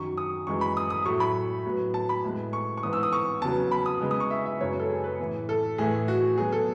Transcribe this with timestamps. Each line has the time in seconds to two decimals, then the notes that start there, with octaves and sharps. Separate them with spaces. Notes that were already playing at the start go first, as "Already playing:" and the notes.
Already playing: F#2 D#3 F#3 C#6
0.17 D#6
0.47 F#2 E3 G#3 C#6
0.61 B5
0.77 D#6
0.90 D#6
1.05 A2 F#3 A3 C#6
1.20 B5
1.65 A2 F#3 B3
1.94 A5
2.09 B5
2.24 A2 G#3 B3
2.53 C#6
2.77 C#6
2.83 G#2 E3 B3 D#6
2.93 E6
3.03 D#6
3.13 C#6
3.42 E2 C#3 F#3 B3 A5
3.71 B5
3.86 D#6
4.01 C#3 G#3 B3
4.11 D#6
4.20 C#6
4.31 E5
4.46 E5
4.60 F#2 C#3 G#3 B3 C#5
4.79 A4
4.90 G#4
5.04 B4
5.19 A2 E3 B3
5.49 A4
5.78 A2 E3 A3 G#4
6.08 F#4
6.37 B2 F#3 B3 G#4
6.52 A4